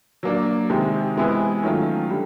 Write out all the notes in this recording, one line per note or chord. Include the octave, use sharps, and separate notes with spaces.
F#3 A#3 D4
C3 D#3 G#3
C3 E3 G#3 B3 E4
D#3 F#3 A3 C#4 F4
D3 G3